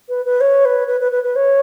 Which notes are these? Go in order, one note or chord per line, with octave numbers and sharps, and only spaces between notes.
B4
B4
C#5
B4
B4
B4
B4
B4
C#5